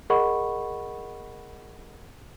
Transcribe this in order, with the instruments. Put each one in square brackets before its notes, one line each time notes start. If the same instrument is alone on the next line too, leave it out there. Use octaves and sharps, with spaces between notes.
[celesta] G#4 A#4 D#5 F#5 B5 C#6